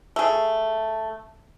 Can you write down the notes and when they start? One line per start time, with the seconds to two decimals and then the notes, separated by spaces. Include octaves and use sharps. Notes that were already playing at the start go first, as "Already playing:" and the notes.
0.16 A3 G#4